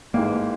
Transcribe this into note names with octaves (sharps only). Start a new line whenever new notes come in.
A1 G#2 E3 G#3 A#3